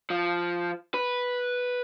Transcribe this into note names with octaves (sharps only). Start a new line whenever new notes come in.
F3
B4